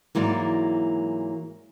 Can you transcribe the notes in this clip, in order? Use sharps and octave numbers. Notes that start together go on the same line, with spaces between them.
G#2 E3 F#3 A#3 D5